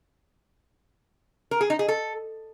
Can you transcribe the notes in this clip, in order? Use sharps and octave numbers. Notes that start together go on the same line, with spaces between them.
A#4
G#4
D#4
G#4
A4